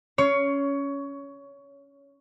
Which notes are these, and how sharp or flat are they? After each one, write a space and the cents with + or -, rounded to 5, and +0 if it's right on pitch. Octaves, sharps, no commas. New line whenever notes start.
C#4 +10 C#5 +20 C6 +0